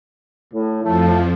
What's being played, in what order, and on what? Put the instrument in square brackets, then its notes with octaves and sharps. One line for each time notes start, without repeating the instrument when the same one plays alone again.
[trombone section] A2
[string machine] F2 F3 [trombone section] A2 A3